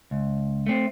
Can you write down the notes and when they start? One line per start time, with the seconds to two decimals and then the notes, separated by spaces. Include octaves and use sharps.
0.11 C#2
0.67 A3 C4